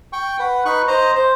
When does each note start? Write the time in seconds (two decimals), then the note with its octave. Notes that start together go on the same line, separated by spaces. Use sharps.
0.13 G5 C#6
0.39 B4 F#5
0.65 D#4 B4 C#6 F#6
0.88 C5 D#5 A#5
1.15 C5